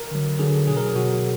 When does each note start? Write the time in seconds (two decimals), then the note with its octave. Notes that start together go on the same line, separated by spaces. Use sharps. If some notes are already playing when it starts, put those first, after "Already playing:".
Already playing: A#4
0.11 D3 F#3
0.39 D3 F#3 G#4
0.67 B2 F#3 G#4
0.77 A#4
0.86 G#4
0.96 B2 F#3 F#4